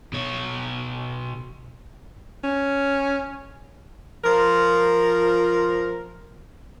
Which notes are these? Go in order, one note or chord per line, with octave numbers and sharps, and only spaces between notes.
B2 C#5
C#4
F3 A#4